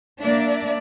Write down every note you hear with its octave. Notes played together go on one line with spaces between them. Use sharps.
A#3 D4 D5 E5